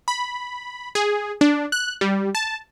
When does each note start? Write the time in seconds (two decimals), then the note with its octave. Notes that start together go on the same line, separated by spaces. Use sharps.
0.08 B5
0.95 G#4
1.41 D4
1.72 F#6
2.01 G3
2.35 A5